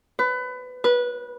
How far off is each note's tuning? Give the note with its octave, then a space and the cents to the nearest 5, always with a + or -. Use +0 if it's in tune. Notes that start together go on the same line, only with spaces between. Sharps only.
B4 +25
B4 -20